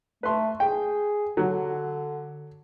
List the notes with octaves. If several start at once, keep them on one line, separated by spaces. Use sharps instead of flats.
A3 B4 C6
G#4 G5
D3 F#3